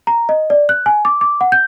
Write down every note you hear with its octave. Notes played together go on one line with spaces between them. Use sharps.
A#5
D#5
D5
F#6
G#5
D6
D6
F#5
G6